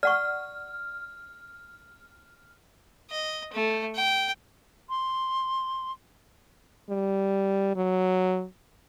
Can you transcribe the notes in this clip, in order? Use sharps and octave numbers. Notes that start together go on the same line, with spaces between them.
D5 F#5 C#6 F6
D#5
A3
G5
C6
G3
F#3